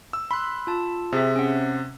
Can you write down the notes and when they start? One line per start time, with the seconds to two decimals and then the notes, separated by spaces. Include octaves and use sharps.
0.13 E6
0.31 B5 C6 F#6
0.67 F4 A5
1.12 C3 G#4 E5
1.36 C#4 F#5